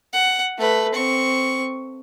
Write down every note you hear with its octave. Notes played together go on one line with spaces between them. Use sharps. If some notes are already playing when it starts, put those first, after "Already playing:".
F#5
A3 B4
C4 C#6